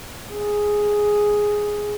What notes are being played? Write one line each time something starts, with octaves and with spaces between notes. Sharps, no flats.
G#4